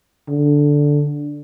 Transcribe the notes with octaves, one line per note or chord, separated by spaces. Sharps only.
D3